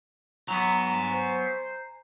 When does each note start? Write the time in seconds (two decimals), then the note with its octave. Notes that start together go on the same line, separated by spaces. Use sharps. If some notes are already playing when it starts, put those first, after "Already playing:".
0.48 F#3 B3 G#5 A#5
1.10 C5